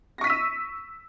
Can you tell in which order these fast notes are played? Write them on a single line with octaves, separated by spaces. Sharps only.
A#6 C#6 B6 D#7 E6